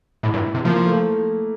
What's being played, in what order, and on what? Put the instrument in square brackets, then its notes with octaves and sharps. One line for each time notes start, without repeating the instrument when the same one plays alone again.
[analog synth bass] A2 [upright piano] E4
[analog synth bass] G2
C3
[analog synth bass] F3 [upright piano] A#3
[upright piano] A3